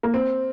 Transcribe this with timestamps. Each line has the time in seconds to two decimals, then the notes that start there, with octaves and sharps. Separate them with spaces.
0.03 A#3
0.14 C4